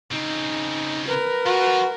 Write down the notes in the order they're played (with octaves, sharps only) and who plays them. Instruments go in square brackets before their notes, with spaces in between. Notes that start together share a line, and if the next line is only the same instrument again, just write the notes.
[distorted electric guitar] C#3 C4 [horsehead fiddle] D#4
[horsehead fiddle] A#4 [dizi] B4
[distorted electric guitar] F3 F4 [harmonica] F#4